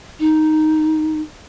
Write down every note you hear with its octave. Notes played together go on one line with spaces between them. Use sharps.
D#4